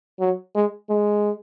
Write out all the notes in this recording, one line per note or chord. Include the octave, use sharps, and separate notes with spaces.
F#3
G#3
G#3